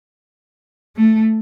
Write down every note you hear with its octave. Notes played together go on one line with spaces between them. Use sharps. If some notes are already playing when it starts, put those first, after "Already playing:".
A3